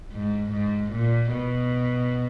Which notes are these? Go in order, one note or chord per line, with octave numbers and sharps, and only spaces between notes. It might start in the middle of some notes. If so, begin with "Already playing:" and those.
G#2
G#2
A#2
B2